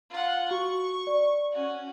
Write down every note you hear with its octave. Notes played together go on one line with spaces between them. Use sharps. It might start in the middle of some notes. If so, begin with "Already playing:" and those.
F4 F#5
F#4 C#6
D5
C#4 F#4